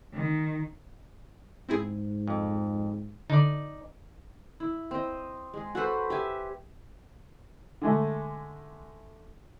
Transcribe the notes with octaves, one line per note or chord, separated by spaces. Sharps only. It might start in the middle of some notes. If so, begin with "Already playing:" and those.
D#3
G#2 C4 E4 G#4
F2
D3 D#4 D5
E4
C4 D#5
G#3 G#4
F#4 A4 B4 C5
G4 E5 G#5
D3 G#3 A3